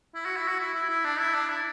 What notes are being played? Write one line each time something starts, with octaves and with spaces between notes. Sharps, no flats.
E4
F#4
E4
F#4
E4
E4
E4
D4
E4
D4
E4